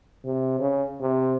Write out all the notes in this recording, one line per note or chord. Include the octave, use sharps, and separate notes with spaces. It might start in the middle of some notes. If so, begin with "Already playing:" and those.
C3
C#3
C3